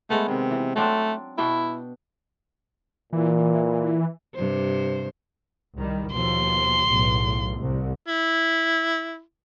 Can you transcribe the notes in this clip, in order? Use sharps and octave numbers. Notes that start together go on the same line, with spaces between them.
G#3 A3 B3
C3 D#3
E3
F#3 A3 C4 D4
B2 D4 E4 G5
A#2 E3
G2 C3 C5
C2 D#3 G3
D#2 B2 F3 C6
B1 E2 A2
C2
E4